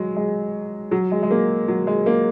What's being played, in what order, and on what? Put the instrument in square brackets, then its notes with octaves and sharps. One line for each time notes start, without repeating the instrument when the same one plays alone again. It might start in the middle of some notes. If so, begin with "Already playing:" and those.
Already playing: [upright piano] F#3 G#3
G#3
F#3
G#3
G#3
A#3
F#3
G#3
A#3